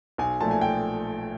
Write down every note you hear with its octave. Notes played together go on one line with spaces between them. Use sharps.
B1 G#5
A#2 F3 A3 A5
G#5
G5